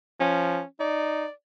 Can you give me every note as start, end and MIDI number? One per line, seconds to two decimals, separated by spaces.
0.20 0.62 53
0.20 0.64 61
0.80 1.27 63
0.80 1.31 74